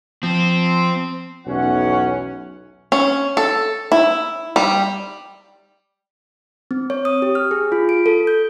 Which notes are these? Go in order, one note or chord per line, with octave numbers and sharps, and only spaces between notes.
F3 C4
B1 E2 C#4 F#5
C#4
A4
E4
G3
C4
C#5
D#6
G4
F6
G#4
F4
D7
A4
G6